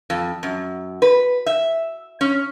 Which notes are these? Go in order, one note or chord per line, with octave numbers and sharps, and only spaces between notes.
F2
F#2
B4
E5
C#4